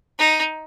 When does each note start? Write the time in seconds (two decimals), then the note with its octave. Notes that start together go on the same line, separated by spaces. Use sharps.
0.19 D#4